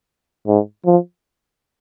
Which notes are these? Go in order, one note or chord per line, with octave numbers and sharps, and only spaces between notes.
G#2
F3